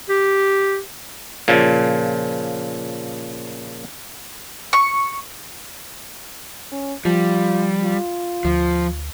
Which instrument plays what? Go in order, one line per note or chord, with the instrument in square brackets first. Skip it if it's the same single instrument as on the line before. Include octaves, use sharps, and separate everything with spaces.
[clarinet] G4
[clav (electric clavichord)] A#2 C#3 F3
[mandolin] C#6
[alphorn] C#4
[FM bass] F3 [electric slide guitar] G3 [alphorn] F4
[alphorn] F4
[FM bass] D2 [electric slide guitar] F3